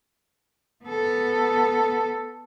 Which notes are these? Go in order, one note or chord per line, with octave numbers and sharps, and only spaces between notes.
B3 A4